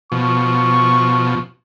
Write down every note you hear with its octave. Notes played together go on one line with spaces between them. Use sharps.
B2 F3 C#6